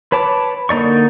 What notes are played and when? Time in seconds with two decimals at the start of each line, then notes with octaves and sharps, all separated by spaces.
0.12 B4 C#5 A5 D6
0.69 D3 A#3 D#4 D5 C#6